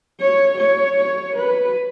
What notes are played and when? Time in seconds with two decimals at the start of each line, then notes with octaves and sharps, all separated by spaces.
0.20 C#5
0.59 C#5
0.97 C#5
1.36 B4